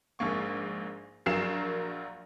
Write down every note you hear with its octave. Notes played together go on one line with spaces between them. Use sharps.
A#1 G#2 A#3 C#6
A#1 F#3 A#4 F5 C7 E7